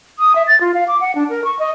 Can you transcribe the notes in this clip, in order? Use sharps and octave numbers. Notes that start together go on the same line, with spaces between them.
D#6
E5
A6
F4
F5
D6
F#5
D4
A#4
C#6
D#5